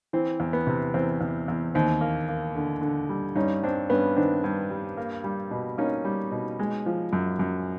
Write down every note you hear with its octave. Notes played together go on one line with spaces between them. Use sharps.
E3 C4
E2
B3
C3
E2 C4
E2
E2
D#2 C4
A#3
A#3
D3
D3
G3
G2 C#4 D#4
G2 C4 D4
G2 B3 C#4
D#3 C4 D4
G2
G3
A#3
G3
B2
A#3 C#4 D#4
G3
B2
G#3
F3
F#2
F#2